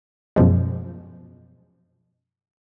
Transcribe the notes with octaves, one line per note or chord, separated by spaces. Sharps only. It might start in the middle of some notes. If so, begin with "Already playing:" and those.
F#2 B2 F3 G#3